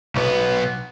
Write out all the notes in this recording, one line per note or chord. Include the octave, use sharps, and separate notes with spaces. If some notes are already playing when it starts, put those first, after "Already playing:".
B1 B3